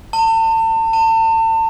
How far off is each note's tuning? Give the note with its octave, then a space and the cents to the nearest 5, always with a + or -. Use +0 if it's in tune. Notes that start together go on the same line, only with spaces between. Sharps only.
A5 +35
A5 +35